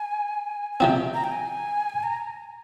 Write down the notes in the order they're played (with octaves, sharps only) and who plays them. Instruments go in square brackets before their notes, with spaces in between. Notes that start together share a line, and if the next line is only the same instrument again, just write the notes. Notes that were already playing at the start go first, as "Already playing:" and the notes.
Already playing: [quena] G#5
G#5
[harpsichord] C3 F3 C4 [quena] G5
[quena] A#5
G5
G#5
A#5